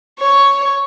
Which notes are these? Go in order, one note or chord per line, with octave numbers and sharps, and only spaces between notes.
C#5